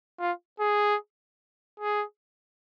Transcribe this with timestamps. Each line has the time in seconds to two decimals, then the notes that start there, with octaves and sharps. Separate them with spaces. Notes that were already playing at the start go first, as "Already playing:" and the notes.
0.20 F4
0.60 G#4
1.80 G#4